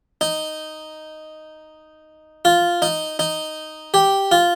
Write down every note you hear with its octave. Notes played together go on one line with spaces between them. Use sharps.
D#4
F4
D#4
D#4
G4
F4